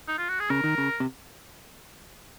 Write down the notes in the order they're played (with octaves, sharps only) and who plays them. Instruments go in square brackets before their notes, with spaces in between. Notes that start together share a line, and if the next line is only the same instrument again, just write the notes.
[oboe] D#4
F4
F#4
G#4
[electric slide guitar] C#3 [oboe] A#4
[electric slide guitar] D#3
C#3
C3